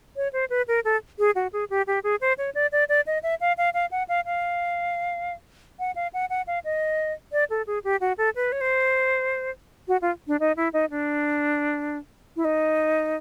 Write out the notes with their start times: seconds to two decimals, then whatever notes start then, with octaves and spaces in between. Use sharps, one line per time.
0.16 C#5
0.33 C5
0.50 B4
0.68 A#4
0.85 A4
1.19 G#4
1.35 F#4
1.53 G#4
1.70 G4
1.87 G4
2.04 G#4
2.21 C5
2.38 C#5
2.55 D5
2.72 D5
2.89 D5
3.07 D#5
3.23 E5
3.41 F5
3.58 F5
3.74 F5
3.91 F#5
4.09 F5
4.26 F5
5.79 F#5
5.96 F5
6.14 F#5
6.30 F#5
6.47 F5
6.65 D#5
7.32 D5
7.50 A4
7.67 G#4
7.84 G4
8.01 F#4
8.18 A4
8.36 B4
8.52 C#5
8.61 C5
9.88 F#4
10.02 F4
10.27 D4
10.40 D#4
10.57 E4
10.73 D#4
10.90 D4
12.36 E4
12.45 D#4